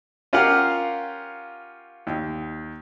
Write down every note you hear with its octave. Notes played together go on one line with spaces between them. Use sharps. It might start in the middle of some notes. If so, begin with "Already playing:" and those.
C#4 F4 G4 A#4 F5 F#5
D#2